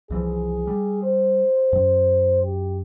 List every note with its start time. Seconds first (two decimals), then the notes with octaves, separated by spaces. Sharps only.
0.10 C2 E3 F3 G#4
0.67 G3
1.03 C5
1.73 F#2
2.43 G4